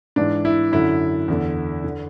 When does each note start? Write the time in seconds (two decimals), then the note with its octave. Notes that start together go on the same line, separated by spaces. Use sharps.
0.16 G#2 E3 D4
0.45 E4
0.72 F#2 D3 E4
1.28 E2 D3
1.84 D3